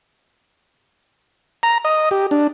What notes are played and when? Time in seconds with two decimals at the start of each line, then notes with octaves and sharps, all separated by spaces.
1.63 A#5
1.85 D#5
2.11 G4
2.31 D4